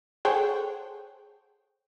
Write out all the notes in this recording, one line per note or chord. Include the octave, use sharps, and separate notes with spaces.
G#4 A4 C5 C#5 F#5 G5